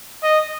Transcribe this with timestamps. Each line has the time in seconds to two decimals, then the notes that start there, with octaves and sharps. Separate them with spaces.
0.23 D#5